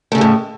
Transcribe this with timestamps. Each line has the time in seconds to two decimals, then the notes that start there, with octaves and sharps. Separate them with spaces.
0.12 A3
0.15 C#3
0.18 G#3
0.21 A2